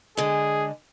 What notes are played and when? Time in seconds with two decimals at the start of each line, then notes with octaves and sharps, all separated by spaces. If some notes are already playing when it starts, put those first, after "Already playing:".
0.17 D3 G#3 G#4